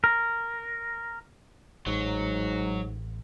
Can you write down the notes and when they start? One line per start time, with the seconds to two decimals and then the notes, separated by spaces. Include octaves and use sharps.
0.04 A#4
1.86 A1 G#2 F#3